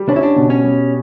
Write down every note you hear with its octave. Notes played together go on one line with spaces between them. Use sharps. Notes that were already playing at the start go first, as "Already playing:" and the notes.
Already playing: G3
C#4 D4
E4
D4
B2
C#4
G3